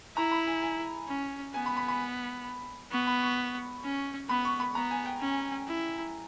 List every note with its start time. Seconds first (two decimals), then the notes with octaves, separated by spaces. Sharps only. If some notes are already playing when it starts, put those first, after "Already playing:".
0.16 E4 A#5
0.32 B5
0.47 G#5
0.62 G#5
1.08 C#4
1.54 B3 G#5
1.66 B5
1.77 B5
1.88 B5
2.92 B3 C#6
3.07 B5
3.23 C#6
3.83 C#4
4.29 B3 B5
4.45 C#6
4.60 B5
4.75 B3 A#5
4.91 G#5
5.06 G5
5.21 C#4
5.68 E4